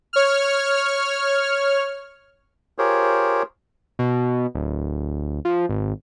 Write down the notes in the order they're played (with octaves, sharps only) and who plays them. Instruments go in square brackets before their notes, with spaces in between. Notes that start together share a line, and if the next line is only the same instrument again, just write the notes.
[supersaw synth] C#5 F6
[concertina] F4 G4 G#4 A#4 C5 C#5
[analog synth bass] B2
D1
F3
G#1